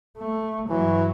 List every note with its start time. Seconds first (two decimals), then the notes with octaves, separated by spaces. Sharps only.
0.18 A3
0.70 G2 E3 F#3